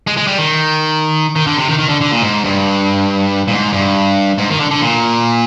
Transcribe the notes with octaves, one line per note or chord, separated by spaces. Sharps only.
G#3
G#3
G3
D#3
D#3
D3
C3
D#3
D#3
D3
D3
A#2
G#2
G2
A#2
G#2
G2
G#2
D#3
D3
D3
A#2